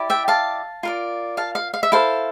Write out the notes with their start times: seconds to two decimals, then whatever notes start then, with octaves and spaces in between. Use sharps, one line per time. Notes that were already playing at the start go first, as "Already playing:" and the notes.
Already playing: E4 G4 D5
0.10 E5 G5
0.28 F5 A5
0.83 F4 A#4 D5
1.37 F5 A5
1.55 F5
1.74 F5
1.83 E5
1.92 E4 A4 C5 F5